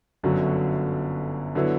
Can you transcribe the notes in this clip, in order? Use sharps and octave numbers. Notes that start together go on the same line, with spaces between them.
G1 F#2 D3 F#3
D3 F#3 B3 E4